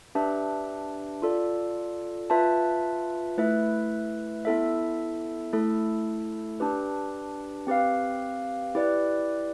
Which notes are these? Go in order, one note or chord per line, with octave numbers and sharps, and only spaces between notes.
D4 G4 B4 E5
F4 A4 D5
F4 B4 E5 A5
A3 E4 B4 E5
B3 E4 A4 E5
A3 E4 A4
D4 G4 B4
C4 G4 B4 F5
E4 G4 B4 D5